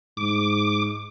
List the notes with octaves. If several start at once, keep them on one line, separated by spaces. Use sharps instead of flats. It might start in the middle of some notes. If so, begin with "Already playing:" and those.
G#2 D6